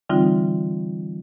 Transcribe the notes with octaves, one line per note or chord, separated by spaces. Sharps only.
D3 E3 G3 C4 D#4 F4